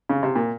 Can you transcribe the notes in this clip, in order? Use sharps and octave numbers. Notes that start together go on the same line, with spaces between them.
C#3
C3
A#2